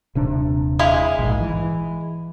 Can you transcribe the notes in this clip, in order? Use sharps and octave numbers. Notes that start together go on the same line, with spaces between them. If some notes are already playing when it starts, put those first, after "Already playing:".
D#1 C3 D4
G#3 E4 F5
A#1 G#2
E3